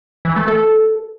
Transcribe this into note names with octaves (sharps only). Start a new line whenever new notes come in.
E3
A3
A4